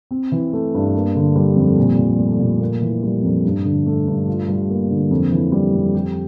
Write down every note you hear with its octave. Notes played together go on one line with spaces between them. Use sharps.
C4
E3
A3
G2
A#3
D3
G3
F2
A#2
F3
A3
A#2
A#3
E3
G3
F2
G2
D3
A3
G2
F4
G3
A#3
D3
F2
E3
G3
F2
G4